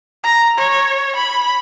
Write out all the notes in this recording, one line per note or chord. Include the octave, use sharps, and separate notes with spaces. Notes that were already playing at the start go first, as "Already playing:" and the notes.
A#5
C#5
B5